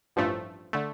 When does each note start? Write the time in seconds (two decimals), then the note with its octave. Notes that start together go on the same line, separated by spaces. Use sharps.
0.16 A1 G2 F3 A3
0.73 D3 A3